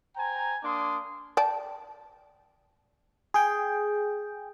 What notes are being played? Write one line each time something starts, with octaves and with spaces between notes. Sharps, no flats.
C5 G5 G#5 A#5
A#3 D4 C6 D6 D#6
D5 G5 A5
G#4 G5